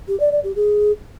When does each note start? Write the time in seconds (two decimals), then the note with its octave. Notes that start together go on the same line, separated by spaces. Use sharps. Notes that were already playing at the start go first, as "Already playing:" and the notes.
0.08 G4
0.20 D5
0.32 D5
0.44 G4
0.56 G#4